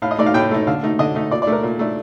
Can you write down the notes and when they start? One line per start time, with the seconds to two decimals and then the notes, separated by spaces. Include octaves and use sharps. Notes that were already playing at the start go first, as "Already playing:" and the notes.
0.02 A2 F5
0.11 D#5
0.18 A3 D#4 D5
0.26 F5
0.34 A2 G5
0.51 A3 D#4
0.67 D3 F5
0.83 A3 D#4
0.99 D3 D#5
1.15 A3 D#4
1.31 A#2 D5
1.42 D5
1.47 A3 D4 A#4
1.63 A#2
1.79 A3 D4